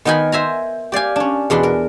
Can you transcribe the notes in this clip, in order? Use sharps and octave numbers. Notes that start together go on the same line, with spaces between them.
D#3 B3 D#4 A#4 G#5 B5
C5 E5 G#5 A#5
G4 D5 F5 G#5
C#4 D4
E2 B2 D4 B4 C6
A#4